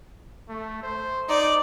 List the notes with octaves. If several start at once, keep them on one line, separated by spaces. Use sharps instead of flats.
A3
C5
D#4 D5